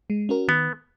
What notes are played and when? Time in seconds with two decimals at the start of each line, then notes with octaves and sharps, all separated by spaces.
0.10 G#3
0.29 C#4 F#4 A#4
0.48 D#3 B3